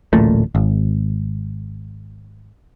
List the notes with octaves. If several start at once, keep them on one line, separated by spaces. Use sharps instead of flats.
D1 A1 A#2 A3
G#1